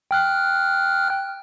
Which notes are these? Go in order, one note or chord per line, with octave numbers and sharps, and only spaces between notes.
G5 F6 F#6